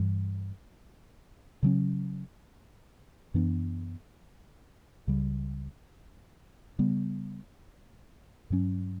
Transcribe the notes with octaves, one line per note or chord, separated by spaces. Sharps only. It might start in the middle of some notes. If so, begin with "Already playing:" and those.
Already playing: G2 E3 G3
C#3 F#3 C#4
F#2 E3 B3 D4
C#2 C#3 G3
C#3 G3 B3
G2 F#3 C#4